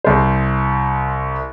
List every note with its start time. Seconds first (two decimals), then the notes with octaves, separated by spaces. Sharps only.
0.04 C2 C5